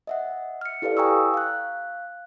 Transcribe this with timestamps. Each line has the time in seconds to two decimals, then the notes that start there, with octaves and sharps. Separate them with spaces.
0.07 D#5 E5 F#5
0.61 F6 C#7
0.82 E4 G4 A4 B4 D5 F5
0.97 G5 G#5 A#5 C#6 D#6 E6
1.34 F5 F#6